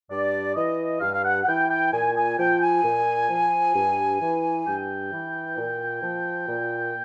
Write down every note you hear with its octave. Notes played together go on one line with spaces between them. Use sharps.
G2 D5
E3 D#5
G2 F5
F5
F#5
F#5
E3 G5
G5
A#2 G#5
G#5
F3 G5
G#5
A#2
F3
G2
E3
G2 G5
E3
A#2
F3
A#2